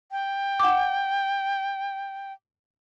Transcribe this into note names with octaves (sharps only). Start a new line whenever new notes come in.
G5
F#5 D6